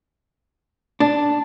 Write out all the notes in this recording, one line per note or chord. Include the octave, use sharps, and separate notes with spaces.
D4